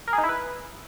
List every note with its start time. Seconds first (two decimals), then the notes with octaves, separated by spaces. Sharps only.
0.08 A#4
0.13 G#4
0.18 D#4
0.24 E4
0.29 B4